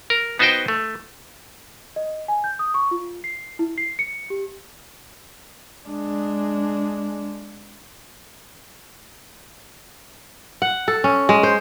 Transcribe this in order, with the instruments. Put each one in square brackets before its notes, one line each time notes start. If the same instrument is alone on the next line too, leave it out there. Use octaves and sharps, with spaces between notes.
[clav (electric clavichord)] A#4
B3 D#4 F#4 C5 D#5 G5
A3
[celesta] D#5
G#5
G6
D#6
C#6
F4
C7
E4
C7
C#7
G4
[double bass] G#3 D4
[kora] F#5
A4
C#4
G#3
C5